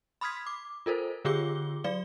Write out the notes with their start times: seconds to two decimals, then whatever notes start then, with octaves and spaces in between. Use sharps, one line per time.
0.21 B5 C6 D#6 F6 G#6 B6
0.47 D6
0.86 F4 A4 A#4 C5
1.25 D3 F4 G4 G#4 D6 G7
1.84 F#3 D5 F5 G7